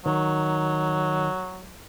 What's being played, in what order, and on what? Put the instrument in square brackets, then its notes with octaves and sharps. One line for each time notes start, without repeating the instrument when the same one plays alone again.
[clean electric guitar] D#3 [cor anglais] F#3